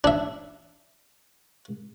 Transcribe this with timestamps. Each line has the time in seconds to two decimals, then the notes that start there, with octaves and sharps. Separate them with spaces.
0.04 D4 E5